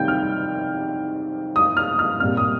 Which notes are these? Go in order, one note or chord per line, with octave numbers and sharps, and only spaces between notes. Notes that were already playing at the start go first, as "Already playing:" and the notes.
Already playing: C3 D#3 G3 C4 G5 G6
F6
D#6
F6
F6
A#2 G3 C4 F6
D#6